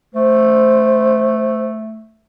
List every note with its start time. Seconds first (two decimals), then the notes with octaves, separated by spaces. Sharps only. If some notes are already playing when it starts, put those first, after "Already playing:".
0.14 A3 C5